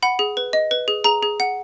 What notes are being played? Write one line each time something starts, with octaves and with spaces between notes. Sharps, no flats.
F#5 B5
G#4
B4
D#5
B4
G#4
G#4 A#5
G#4
F#5